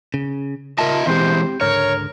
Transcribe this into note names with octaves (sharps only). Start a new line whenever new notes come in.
C#3
C#3 F4 A#4 D#5 E5 A5
E3 G#3 C4 G4 C5
C#2 G#2 D3 A#4 C#5